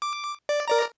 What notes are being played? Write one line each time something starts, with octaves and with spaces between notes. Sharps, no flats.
D6
D5
A#4 D5 A#5